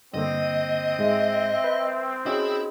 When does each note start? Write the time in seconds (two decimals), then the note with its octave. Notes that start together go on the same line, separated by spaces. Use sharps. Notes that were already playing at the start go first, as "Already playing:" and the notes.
0.14 G2 D3 A#3 C4 D#5
0.99 G#2 G#3 E5
1.64 B4
2.26 C#4 E4 F#4 G#4 D#5